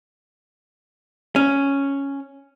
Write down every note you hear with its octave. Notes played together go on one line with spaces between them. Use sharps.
C#4